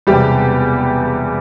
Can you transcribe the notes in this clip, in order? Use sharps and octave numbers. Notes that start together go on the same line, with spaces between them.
E1 E2 C3 G3 G4